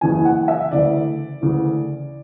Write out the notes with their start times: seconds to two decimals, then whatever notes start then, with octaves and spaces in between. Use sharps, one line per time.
0.01 F#1 E2 C#3 E3 G#5
0.25 F#5
0.48 E5
0.71 D2 C#3 E3 D5
1.41 D2 C#3 E3